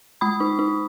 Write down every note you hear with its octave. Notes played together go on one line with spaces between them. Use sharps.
G#3 B5 D#6
D#4
D#4